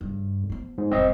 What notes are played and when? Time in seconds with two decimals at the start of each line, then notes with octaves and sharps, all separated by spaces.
0.01 G2 C#3
0.50 F3 B3
0.78 G#2
0.91 E1 G2 C4 D#5